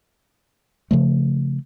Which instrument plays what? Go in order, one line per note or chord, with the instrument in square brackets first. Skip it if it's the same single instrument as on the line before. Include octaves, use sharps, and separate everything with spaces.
[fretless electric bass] C#3 F3 A3